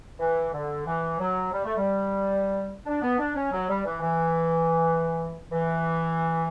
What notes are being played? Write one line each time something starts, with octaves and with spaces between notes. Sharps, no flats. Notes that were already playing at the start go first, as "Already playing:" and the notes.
E3
D3
E3
F#3
G3
A3
G3
D4
B3
D4
C#4
F#3
G3
E3
E3
E3